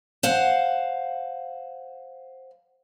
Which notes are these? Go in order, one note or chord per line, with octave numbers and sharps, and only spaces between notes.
C5 F5 F#5